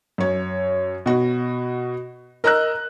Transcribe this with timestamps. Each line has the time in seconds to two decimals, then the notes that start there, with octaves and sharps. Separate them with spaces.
0.18 F#2 C#5
1.06 B2 F#4
2.44 A#4 D#5 A#5 E6 F#6